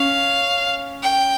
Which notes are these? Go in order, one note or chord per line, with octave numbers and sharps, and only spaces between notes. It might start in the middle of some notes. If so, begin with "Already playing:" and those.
Already playing: C#4 F5
G5